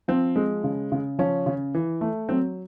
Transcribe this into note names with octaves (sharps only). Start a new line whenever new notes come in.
F3 C4
G#3
C#3
C#3
F3 C#4
C#3
E3
A3
F#3 C4